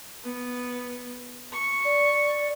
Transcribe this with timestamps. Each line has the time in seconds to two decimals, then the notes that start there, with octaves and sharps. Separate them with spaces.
0.24 B3
1.52 C#6
1.85 D5